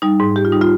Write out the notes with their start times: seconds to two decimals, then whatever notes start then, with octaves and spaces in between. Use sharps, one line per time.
0.02 G3 D#4
0.20 G#2
0.36 G#2 G4
0.45 F4
0.52 G3 D#4
0.61 F4